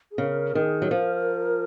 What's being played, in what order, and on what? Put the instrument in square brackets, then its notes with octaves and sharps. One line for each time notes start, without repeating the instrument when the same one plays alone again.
[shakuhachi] G#4
[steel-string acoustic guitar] C#3 [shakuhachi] A#4
[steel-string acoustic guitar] D#3 [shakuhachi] G#4
[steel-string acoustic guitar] F#3
[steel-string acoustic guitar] F3 [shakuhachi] A#4